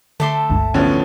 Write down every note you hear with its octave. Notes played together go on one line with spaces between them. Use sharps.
D3 A3 E5 A5 C6 D6
G1 C#2 G2
E2 A2 D3 F3 B3 C#4